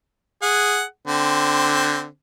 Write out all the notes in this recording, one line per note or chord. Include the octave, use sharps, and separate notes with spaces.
G#4 F#5
D3 C4